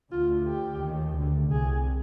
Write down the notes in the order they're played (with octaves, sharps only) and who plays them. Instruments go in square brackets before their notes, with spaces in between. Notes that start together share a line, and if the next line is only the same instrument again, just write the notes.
[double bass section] D2 D3 [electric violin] F4
[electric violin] G4
[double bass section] D#2 D#3
D2 D3
[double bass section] C2 C3 [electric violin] G#4